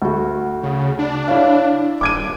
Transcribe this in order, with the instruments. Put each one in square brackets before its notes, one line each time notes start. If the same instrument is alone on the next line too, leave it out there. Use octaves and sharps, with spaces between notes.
[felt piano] D2 F#4
[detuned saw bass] C#3
D4
[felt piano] E4 C#5 F5
[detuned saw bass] D#1 [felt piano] D6 G#6 D#7